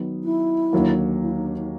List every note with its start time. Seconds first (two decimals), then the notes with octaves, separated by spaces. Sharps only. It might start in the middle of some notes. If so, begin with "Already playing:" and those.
Already playing: D#3 F#3 B3
0.24 E4
0.73 D#2 D3 F#3 A#3
1.22 E4
1.35 D#4
1.46 D4
1.59 D#4